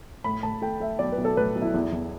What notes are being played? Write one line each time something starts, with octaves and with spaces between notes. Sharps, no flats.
A2 B5
A2 A5
A3 G5
A3 E5
B1 D5
B4
B1
A4
A2 B4
B1
E4
E2
E2